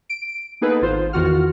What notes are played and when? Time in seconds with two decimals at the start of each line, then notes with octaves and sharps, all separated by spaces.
0.09 D7
0.61 A#3 B3 D#4 G#4 A4 B4
0.82 G#1 F4 C5
1.13 E2 D#3 F4 F#4 F#5 F6